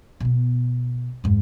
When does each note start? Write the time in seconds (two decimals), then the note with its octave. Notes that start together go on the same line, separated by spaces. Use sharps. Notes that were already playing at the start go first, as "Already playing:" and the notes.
0.20 B2 B3
1.24 F2 G#2